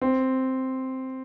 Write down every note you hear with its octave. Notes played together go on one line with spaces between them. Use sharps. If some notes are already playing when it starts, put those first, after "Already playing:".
C4